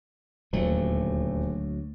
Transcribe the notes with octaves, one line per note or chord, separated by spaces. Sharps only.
D#1 D2 F#3 A3